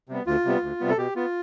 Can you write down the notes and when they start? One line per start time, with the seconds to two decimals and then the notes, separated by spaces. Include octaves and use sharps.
0.09 C3 G3 B3
0.26 D2 F4
0.45 C3 G3 B3
0.62 D2
0.80 C3 G3 B3
0.89 A4
0.98 B2 G4
1.16 B3 F4